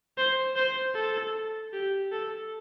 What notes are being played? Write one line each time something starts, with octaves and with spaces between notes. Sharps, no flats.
C5
C5
A4
G4
A4